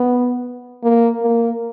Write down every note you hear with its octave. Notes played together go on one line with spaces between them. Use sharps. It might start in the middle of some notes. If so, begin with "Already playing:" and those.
Already playing: B3
A#3
A#3